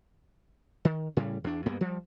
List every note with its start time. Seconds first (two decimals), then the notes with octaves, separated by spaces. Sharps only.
0.85 D#3
1.17 A2 C#3 G3
1.44 E2 D4
1.66 D2 G2 A#3 B3
1.81 F3 G3